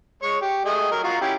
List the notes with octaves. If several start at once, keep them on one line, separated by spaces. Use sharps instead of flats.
G#3 C#5 C#6
G4
A3 G#4 D#5
F#3 A#4
F4 F#4 A#5
C#4 E4 G4